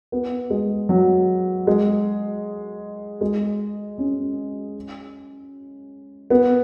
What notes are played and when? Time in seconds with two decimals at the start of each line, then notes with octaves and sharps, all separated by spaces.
0.12 B3
0.50 G#3
0.89 F#3
1.67 G#3
3.21 G#3
3.98 C#4
6.30 B3